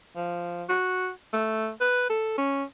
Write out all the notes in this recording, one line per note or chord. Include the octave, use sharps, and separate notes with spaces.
F3
F#4
A3
B4
A4
C#4